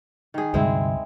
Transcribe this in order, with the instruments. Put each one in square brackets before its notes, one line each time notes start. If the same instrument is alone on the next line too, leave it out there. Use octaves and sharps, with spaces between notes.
[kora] D#3 G#4
[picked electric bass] D2 G2 C3 [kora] G#3 C4 E4